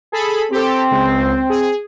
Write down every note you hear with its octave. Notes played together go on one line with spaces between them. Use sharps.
G#4 A4 B5
C4 G4 A4
C#2
G#4